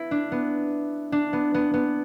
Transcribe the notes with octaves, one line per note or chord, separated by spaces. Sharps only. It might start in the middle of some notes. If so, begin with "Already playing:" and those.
Already playing: B3 E4
D4
B3
D4
B3
B3
B3